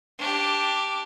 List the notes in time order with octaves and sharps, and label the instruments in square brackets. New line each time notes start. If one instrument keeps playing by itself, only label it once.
[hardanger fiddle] D4 G4